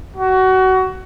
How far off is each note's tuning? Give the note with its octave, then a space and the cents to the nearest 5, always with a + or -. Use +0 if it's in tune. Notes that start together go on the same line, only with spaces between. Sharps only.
F#4 +25